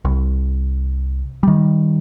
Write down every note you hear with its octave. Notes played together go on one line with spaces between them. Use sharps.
C2
D#3 G3